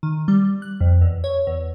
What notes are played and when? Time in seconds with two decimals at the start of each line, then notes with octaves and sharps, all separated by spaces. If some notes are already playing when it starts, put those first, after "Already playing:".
0.03 D#3
0.28 G3
0.62 F#6
0.81 F2
1.01 E2
1.24 C#5
1.47 E2